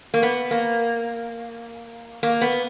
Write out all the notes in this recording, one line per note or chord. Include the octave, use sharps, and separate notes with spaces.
A#3
B3
A#3
A#3
B3